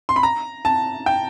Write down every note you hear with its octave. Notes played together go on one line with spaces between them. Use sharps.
C6
B5
A#5
A5
G5